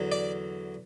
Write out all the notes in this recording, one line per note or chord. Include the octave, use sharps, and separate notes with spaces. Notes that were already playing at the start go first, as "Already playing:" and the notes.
Already playing: E2 D3 F#3
D5